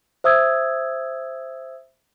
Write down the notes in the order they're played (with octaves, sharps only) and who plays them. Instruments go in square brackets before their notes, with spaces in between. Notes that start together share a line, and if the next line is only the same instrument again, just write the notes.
[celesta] C5 E5 D#6 E6 G#6